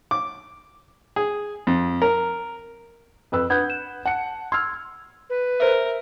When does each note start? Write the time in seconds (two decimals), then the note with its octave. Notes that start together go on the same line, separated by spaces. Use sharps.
0.11 D6
1.16 G#4
1.67 F2
2.02 A#4
3.32 F2 B4 E6
3.50 D4 B4 F#5 D#6 G6 G#6
3.70 E7
4.05 F#5 A5 C#7
4.52 C6 E6 F6 G#6
5.30 B4
5.60 A#4 C5 E5